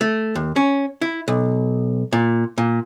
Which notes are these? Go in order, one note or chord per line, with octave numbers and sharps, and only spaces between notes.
A3
D#2
C#4
E4
B1
A#2
A#2